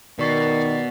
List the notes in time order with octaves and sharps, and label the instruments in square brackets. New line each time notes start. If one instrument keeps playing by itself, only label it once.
[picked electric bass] B2 [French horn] D#3 [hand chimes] A#4 C#6 C7 [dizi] D5